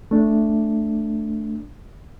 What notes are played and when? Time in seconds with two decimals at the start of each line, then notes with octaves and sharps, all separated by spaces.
0.11 A3 D4